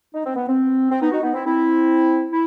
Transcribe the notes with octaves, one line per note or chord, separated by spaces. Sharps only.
D#4
C4
B3
C4
C4
B3 D#4
D#4 F#4
B3 D#4
C4 E4
C4 E4
E4